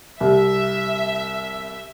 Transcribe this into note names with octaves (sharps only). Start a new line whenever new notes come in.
C2 E5